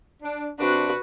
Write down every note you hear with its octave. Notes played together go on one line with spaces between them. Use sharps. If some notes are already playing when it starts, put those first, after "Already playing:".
D4
C3 D4 F#4 B4